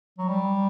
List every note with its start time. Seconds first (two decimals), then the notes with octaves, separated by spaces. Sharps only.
0.18 F#3
0.28 G3